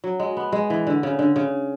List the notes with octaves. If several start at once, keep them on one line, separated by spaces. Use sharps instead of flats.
F#3
G#3
B3
G#3
E3
D3
C#3
D3
C#3